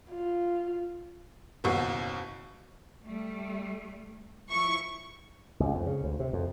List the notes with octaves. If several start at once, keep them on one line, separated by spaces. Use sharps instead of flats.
F4
F#1 D#2 B2 F#4 C7
G3 A3
F3 E4 C#6
C#2
F2
C#3
D2
C3
F2